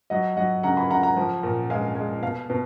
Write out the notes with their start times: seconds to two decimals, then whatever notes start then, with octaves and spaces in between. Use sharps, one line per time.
0.10 F#3 D#5 F#5
0.37 F#3 D#5 F#5
0.63 C#3 F#5 A#5
0.77 G#5 B5
0.90 C#3 F#5 A#5
1.03 F#5 A#5
1.17 F3
1.43 A#2
1.70 G#3 F5 G#5
1.96 G#3
2.22 B2 F5
2.50 B2